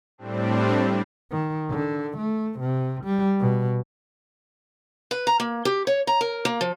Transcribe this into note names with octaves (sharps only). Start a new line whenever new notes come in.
A2 G3 C4 D4
D#3
D3
A3
C3
G3
B2
B4
A#5
A#3
G4
C#5
A#5
A#4
A#3
F3